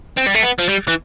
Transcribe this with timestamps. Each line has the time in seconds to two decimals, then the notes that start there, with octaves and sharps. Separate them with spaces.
0.17 C4
0.26 G3
0.34 A3
0.43 B3
0.59 F3
0.69 G3
0.88 E3